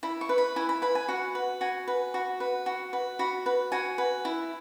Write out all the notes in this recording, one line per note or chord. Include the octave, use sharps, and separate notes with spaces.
E4 B5
C#6
B4
B5
E4 G#5
B5
B4 B5
G#5
F#4 F#5
B4
F#4 G#5
B4
F#4
B4
F#4
B4
F#4 B5
B4
F#4 G#5
B4
E4